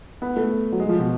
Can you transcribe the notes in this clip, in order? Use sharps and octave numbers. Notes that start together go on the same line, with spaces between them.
B3
A3
F#3
G#3
F3
B2